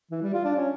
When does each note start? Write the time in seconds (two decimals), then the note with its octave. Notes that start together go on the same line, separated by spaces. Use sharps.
0.11 E3
0.22 G3
0.34 F4
0.44 D4
0.56 C#4